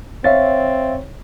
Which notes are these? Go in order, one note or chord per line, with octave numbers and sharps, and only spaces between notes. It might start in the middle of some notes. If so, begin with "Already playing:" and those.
C4 C#5 E5 F5 A6